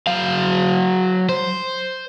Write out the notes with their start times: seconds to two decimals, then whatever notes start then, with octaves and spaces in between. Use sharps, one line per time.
0.07 F#3 F5
1.29 C5